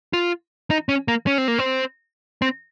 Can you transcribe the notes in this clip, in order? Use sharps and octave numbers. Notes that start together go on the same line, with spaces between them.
F4
D#4
C#4
A#3
C#4
C4
A#3
C4
C4